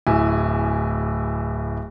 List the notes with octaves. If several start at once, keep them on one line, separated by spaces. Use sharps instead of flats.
D1 E4 G#5